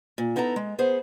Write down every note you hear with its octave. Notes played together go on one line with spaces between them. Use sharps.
A#2
B3 D#4 E4 A4 A#5
G#3
B3 G#4 C5